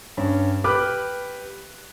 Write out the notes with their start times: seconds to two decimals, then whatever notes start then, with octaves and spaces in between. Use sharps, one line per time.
0.17 G2 C#4
0.64 G4 B4 B5 D6 F6 F#6